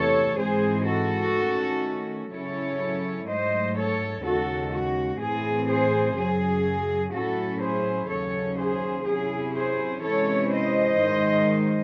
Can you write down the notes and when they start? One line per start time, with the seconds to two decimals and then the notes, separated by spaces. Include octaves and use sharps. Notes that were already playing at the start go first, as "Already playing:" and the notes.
Already playing: E2 C3 E3 A3 A4 C#5
0.38 G#2 E3 G#3 C4 G#4 C5
0.87 F#4 A4
1.35 D#3 A3 C#4
2.31 C#3 F#3 C#4 E4 A4 C#5
3.27 G#2 F#3 A3 C5 D#5
3.76 A4 C#5
4.24 D#2 C#3 G#3 F#4 A4
4.72 F#4
5.21 A2 E3 C4 G#4
5.69 G#4 C5
6.17 F#2 C#3 F#3 G#4
7.13 A2 F#3 C#4 E4 F#4 A4
7.62 G#4 C5
8.10 D#2 C#3 F#3 C#4 A4 C#5
8.59 G#4 C5
9.07 C3 F#3 C#4 E4 G#4
9.55 G#4 C5
10.03 C3 E3 G#3 C#4 E4 A4 C#5
10.52 C5 D#5
11.00 G#2 D#3 G#3